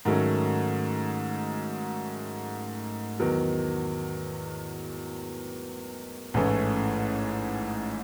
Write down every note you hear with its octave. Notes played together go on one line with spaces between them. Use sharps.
G#2 D#3 F#3 A3 C#4
E2 D#3 F#3 B3
A1 G#2 E3 A3 C#4